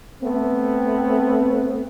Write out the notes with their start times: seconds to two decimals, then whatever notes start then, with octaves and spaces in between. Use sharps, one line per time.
0.22 A3 B3 C4